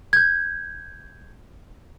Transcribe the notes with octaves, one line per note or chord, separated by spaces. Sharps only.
G6 G#6